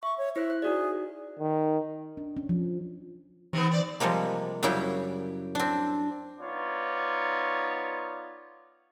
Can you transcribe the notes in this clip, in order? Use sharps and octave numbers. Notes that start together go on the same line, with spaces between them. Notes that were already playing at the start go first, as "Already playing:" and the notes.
E5 C#6
C#5
E4 C5 E5 F#6
F#6
D#4 F#4 G#4 D5
D#3
D4
C#4
F3
C3 D#3 E3 B3
C4 D5
C3 F3 G3 G#3 A#3
F#2 C#3 G3 E4 G4 F#5
C4 D4
B3 D#4 F4 C#5 D5